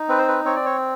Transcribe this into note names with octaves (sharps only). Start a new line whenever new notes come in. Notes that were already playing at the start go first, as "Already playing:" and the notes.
Already playing: D#4
C4 B4
C5
B4
C4 C#5
D5
C#5